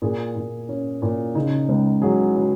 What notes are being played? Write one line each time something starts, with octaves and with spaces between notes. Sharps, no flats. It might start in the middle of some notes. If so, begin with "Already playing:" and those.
A#2 G#4
A#2
C#4
A#2
C#3 D#4
C#2
F#3 G#4
F#3